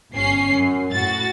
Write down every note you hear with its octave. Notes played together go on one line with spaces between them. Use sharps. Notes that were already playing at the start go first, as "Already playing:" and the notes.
G1 C#4 C7
F#2
A2 F#4 A6